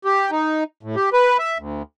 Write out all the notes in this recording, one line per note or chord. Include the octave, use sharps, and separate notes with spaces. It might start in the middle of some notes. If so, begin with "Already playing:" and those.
G4
D#4
A2
G4
B4
E5
D2